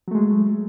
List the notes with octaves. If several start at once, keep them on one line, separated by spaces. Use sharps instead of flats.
F#3 G#3 A3